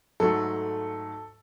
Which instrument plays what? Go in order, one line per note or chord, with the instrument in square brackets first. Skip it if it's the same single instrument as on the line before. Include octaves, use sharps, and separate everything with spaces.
[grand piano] G#2 F#3 A3 A4